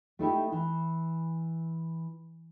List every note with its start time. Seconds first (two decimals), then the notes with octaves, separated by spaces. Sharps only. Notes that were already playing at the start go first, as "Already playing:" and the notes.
0.19 A3 D#4 E4 G4
0.52 E3